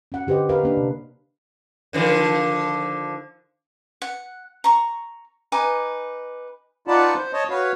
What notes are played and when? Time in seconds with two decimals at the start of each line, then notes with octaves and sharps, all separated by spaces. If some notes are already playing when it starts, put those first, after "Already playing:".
0.12 C#4 F#5
0.27 D3 G4 B4 C5 D#5
0.49 A#4 B4 F5
0.63 A#3 D4
0.77 C3
1.93 D3 D#3 F3
4.02 F#5
4.64 A#5 C#6
5.52 D#4 B4 G#5 D6
6.88 D#4 F4 B4 D5 F#5 A5
7.16 C5
7.33 C#5 D#5 A5
7.50 F#4 B4 C#5 F5